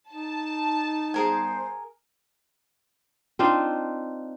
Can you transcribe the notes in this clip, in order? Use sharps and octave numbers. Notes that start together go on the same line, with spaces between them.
D#4 A5
G3 B3 G#4 A#4 C5 G#5
C4 D4 D#4 F4